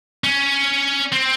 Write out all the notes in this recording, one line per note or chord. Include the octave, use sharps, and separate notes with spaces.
C#4
C4